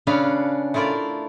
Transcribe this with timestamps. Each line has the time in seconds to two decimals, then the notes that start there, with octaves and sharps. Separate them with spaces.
0.07 C#3 C#4 D4 B4 F5
0.74 A3 E4 F4 A#4 D5